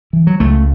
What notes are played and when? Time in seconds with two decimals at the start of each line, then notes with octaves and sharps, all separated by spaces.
0.13 E3
0.27 F#3
0.40 C#2 C#3 A3